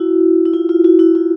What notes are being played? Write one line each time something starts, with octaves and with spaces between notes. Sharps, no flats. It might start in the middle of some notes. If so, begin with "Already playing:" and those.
Already playing: E4 F#4
E4
F4
F4
E4 F#4
E4 F#4
F4